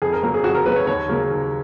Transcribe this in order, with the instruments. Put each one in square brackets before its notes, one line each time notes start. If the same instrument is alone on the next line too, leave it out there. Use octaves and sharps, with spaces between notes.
[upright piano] F2 G#4
A#4
C#3 F#3 A#3 A#4
G#4
F2 F#4
A#4
C#3 F#3 A#3 B4
C#5
D#2 C#5
C#3 F#3 A#3
D#2